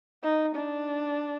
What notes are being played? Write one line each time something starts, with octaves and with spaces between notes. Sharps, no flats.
D#4
D4